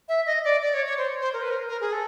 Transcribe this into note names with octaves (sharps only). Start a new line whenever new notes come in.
E5
D#5
D5
D5
C#5
C#5
C5
C5
A#4
B4
A#4
A#4
G#4
A4